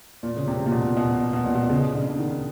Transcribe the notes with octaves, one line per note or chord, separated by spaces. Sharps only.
A#2
C#3
C3
A#2
B2
B2
B2
A#2
B2
C#3
D3
D#3